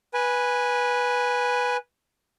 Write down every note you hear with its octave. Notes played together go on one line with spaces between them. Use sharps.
B4 G#5